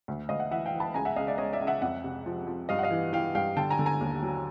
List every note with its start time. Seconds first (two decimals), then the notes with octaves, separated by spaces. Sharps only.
0.08 D2
0.29 D2 D#5 F5
0.40 E5 F#5
0.51 E3 E5 F#5
0.66 F5 G5
0.73 E3
0.80 A5 B5
0.94 C#2 G#5 A#5
1.05 E5 F#5
1.16 C#2 D#5 F5
1.27 D5 E5
1.38 C#2 C#5 D#5
1.53 D5 E5
1.61 C#2
1.67 E5 F#5
1.82 F2 E5 F#5
2.04 C3
2.26 F3
2.47 F3
2.69 G2 D#5 F5
2.79 F#5
2.83 D#5 F5
2.91 E3
3.13 E3 F5 G5
3.35 G2 F5 G5
3.57 D3 G5 A5
3.71 G#5 A#5
3.79 D3
3.86 G#5 A#5
4.01 D#2
4.23 F#3